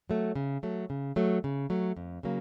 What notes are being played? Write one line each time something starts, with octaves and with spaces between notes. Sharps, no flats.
F#3 A3
C#3
F#3 A3
C#3
F#3 A3
C#3
F#3 A3
F2
C#3 F#3 A#3